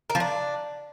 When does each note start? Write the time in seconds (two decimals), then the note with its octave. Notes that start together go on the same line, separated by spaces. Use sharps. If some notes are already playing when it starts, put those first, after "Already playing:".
0.10 A#3
0.15 F3
0.20 D4